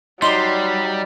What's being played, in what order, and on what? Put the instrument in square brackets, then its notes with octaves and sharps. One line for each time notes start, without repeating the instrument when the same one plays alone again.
[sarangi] F#3 [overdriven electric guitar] G3 [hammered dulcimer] D#4 D5 [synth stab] C6